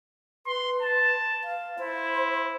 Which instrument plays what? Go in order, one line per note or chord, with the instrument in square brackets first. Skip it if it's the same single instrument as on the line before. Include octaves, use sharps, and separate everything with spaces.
[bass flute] B4 [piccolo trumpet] C6
[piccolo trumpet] A5
[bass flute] F5
[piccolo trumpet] E4 [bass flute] C5